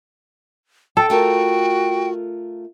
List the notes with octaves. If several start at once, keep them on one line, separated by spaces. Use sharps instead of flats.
A4 G5
A3 F4 F#4 A#4 G5